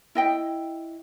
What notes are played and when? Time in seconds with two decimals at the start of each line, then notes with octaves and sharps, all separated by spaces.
0.15 E4 D#5 G5